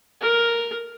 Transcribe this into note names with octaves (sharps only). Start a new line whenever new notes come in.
A#4